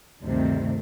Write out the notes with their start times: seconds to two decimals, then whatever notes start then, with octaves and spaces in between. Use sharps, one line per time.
0.23 D2 G2 C3 D#3 A3 C4